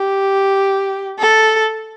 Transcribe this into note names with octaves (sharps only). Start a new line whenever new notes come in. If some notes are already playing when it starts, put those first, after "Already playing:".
Already playing: G4
A4